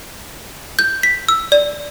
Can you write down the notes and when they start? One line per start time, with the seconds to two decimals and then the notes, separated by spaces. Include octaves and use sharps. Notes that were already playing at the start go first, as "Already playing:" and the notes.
0.79 G6
1.03 B6
1.28 E6
1.52 D5